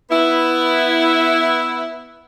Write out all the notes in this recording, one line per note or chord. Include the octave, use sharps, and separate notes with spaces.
B3 E4